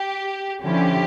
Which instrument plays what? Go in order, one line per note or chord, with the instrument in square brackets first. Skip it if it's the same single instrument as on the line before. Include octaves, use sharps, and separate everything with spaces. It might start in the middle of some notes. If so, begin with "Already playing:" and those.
Already playing: [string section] G4
D3 F3 C#4 E4 G4